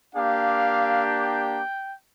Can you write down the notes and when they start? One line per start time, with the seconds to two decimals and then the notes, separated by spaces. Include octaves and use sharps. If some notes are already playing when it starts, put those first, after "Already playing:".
0.14 A#3 D4 G4 F5
1.07 G5